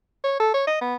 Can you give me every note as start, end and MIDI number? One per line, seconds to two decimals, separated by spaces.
0.24 0.37 73
0.40 0.54 69
0.54 0.66 73
0.67 0.77 75
0.82 0.95 59